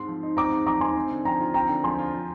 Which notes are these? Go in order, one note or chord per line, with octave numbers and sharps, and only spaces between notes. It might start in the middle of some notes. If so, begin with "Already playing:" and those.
Already playing: G#2 C4 C6
F3
D#4
C4 A#5 D6
G#2
F3 A#5 D6
D#4 G#5 C6
C4
D3
F3 G5 A#5
F4
C4 G5 A#5
D3
F3 G#5 C6
F4
F3